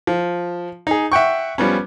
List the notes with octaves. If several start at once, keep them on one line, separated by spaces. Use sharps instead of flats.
F3
D#4 G#4
E5 F#5 G5 C#6
F3 G3 B3 C#4